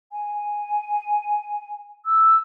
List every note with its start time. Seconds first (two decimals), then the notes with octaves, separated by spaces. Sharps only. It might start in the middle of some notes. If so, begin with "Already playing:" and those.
0.12 G#5
2.05 E6